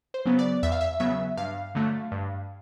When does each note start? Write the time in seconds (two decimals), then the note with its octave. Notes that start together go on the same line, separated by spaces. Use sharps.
0.14 C5
0.26 C#3 F#3 B3
0.39 D5
0.63 E2 E5
0.72 F5
0.81 E5
1.00 C#3 F#3 B3 E5
1.37 G2 F5
1.75 D3 F#3 A3
2.12 G2